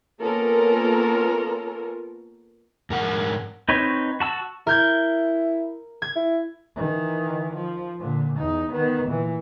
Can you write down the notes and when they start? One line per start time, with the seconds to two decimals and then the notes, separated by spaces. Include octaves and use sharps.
0.20 A#3 B3 C#4 F4 A4 A#4
2.90 G#2 A#4 F#5
3.69 C4 D#4 B4 C#5
4.20 F#4 A5 E6
4.67 E4 A#4 G6 G#6
6.02 G#6
6.16 E4
6.76 D#3 E3
7.55 F3
7.99 A#2 D3
8.38 E2 D#4
8.71 D#3 B3
9.09 A#2 E3